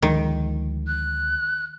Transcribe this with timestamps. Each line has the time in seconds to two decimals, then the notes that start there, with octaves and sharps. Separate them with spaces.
0.02 D2 D#3 F3 G#3
0.87 F#6